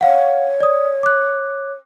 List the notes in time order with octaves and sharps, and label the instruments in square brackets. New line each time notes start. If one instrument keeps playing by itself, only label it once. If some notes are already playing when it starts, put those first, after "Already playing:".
[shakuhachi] C#5 [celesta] F5 F#5
[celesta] D5 D#6
D6 F#6